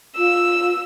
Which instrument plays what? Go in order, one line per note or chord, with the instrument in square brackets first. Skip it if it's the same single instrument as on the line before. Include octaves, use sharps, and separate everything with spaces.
[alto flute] F4 [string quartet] E6